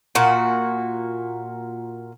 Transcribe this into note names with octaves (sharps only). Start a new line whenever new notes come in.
A#2 F#4